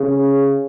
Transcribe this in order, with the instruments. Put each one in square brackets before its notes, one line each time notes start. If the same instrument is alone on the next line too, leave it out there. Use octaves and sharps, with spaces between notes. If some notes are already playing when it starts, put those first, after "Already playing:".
Already playing: [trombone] C#3